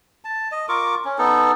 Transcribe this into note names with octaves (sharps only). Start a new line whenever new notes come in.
A5
D#5
F4 A#4 C#6 D6
C#4
B3 D#4 A4